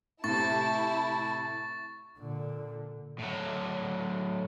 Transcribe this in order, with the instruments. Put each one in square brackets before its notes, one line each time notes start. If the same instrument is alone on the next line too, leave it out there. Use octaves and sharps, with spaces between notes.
[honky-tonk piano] A2 C3 [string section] E4 A5 [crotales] C#6 A6
[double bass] A#2 D3
[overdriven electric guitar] A2 F#3